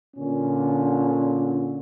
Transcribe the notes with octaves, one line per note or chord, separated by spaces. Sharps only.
A#2 D3 C#4